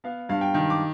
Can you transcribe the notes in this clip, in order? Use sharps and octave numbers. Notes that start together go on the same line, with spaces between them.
B3 F5
G2 F5
G5
D#3
D6